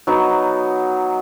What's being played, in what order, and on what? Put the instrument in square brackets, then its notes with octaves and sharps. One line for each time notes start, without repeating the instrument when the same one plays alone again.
[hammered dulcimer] F#3 B3 D#4